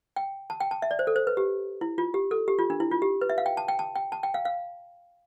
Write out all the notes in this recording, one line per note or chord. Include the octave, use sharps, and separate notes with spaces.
G5
A5
G5
A5
E5
D5
C5
A4
C5
B4
G4
E4
F4
G4
A4
G4
F4
D4
E4
F4
G4
B4
E5
F5
G5
A5
G5
A5
G5
A5
G5
F5
F5